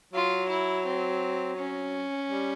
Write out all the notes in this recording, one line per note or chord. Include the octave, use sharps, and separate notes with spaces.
F#3 F4
E4
C4
C#4
G3